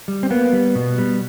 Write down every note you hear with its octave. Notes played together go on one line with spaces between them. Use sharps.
G3
C4
A#3 B3
G3
B2
G3